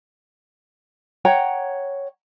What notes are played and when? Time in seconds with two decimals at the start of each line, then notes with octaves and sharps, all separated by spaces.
1.25 C#5 F#5 G5 A#5